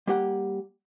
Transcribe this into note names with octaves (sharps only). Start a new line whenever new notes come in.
G3 A#3 G4 F#5